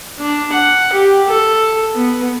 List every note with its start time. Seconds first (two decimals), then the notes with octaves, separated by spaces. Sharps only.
0.19 D4
0.52 F#5
0.93 G4
1.28 A4
1.95 B3